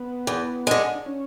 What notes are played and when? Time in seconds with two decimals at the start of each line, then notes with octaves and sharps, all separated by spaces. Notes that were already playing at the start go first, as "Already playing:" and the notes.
Already playing: B3
0.27 E2
0.67 D3 G#3
0.95 D4
1.06 C#4